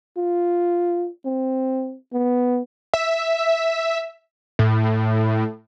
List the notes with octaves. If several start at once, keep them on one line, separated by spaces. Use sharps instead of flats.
F4
C4
B3
E5
A2